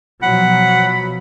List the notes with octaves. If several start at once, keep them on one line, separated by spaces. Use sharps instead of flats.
B2 F3 F#3 F#5 B5